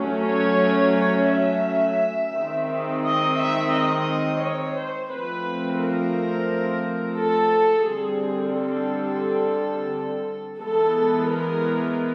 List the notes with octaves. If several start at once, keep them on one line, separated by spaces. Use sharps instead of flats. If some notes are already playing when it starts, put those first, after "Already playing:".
Already playing: F#3 A3 C#4
C#5
C#5
E5
D#3 G#3 C4
D#5
E5
D#5
C#5
C5
F3 A3 C4 B4
A#4
A4
D3 G3 C4 G#4
A4
E3 G#3 B3 A4
A#4